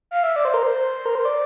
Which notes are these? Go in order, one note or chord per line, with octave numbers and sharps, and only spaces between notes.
F5
E5
D5
C5
A#4
C5
A#4
C5
D5